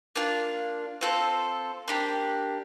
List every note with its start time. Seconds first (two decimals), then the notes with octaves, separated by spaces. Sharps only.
0.16 A#3 D4 F4
1.01 C4 F4 A4 C5
1.88 A#3 D4 G4